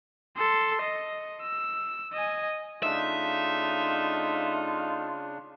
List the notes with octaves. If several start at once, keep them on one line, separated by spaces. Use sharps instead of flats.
A4 C6
D#5
E6
D#5 G#5
C#3 A3 D4 D#4 F4 E5